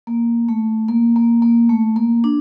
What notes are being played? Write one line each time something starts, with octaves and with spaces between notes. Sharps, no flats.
A#3
A3
A#3
A#3
A#3
A3
A#3
D4